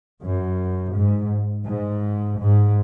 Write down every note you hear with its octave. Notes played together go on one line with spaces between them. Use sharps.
F#2
G#2
G#2
G#2